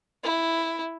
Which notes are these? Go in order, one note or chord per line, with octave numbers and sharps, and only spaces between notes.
E4